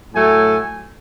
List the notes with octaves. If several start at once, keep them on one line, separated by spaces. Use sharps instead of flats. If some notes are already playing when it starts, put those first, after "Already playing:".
A2 F#3 A3 G#5